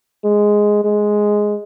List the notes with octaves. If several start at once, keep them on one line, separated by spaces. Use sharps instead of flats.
G#3
G#3